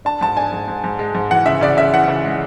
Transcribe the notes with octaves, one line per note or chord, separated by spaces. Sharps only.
D4 A5
G#2 A5
D4 G#5
G#2
G#2
G#2
G#3
G#2
E3 F#5
C#3 E5
C#3 D5
C#3 E5
E3 F#5
C#3
G#3